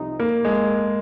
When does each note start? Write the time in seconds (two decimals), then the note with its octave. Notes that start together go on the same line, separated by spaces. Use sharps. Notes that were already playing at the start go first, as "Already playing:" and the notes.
Already playing: C2 C3 F3 C4 D#4
0.20 A#3
0.45 G#3